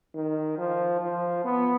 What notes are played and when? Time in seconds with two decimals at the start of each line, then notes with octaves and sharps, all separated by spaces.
0.15 D#3
0.58 F3
1.01 F3
1.45 B3